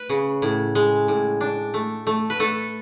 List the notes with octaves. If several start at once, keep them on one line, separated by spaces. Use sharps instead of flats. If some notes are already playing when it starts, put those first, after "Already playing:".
Already playing: B4
C#3
A2
G#3
A2
D4
A3
A3
B4
A3 A4